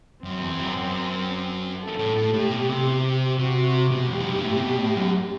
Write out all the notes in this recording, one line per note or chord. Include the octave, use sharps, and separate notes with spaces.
F#2 C4
E2
F#2
F#2
A4
A2
A2
A2 G4
B2
C3
G4
C3 F#4
B2 G4
E2
F#2
G2
A2
C3
B2
A2
F#2